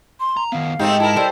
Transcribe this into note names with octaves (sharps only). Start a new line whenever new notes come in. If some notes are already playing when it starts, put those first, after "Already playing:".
C6
A#5
D#3 B3 F5
G#2 G#3 A3 C4 D#4 G4
E4 A#4 A5
G3 A4 C5 C6